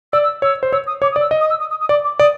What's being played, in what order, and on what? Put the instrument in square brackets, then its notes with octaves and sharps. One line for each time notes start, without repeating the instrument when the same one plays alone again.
[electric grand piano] D5 [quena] E6
[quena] E6
[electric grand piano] C#5 [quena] E6
[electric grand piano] C5
[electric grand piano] C#5 [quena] E6
[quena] D#6
[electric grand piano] C#5 [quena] D6
[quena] D#6
[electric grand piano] D5
[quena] E6
[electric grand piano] D#5
[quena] D#6
E6
D#6
D#6
D#6
[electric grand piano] D5 [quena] D6
[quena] D6
[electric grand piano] D5 [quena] D#6